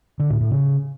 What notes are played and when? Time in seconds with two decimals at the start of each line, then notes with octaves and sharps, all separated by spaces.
0.20 D3
0.30 A2
0.41 A2
0.51 C#3